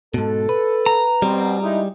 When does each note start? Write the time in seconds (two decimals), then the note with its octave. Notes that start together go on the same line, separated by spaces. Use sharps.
0.14 G#2 B2 A4
0.49 B4
0.86 A#5
1.22 B2 G3 C4
1.62 G#3 D#4 E4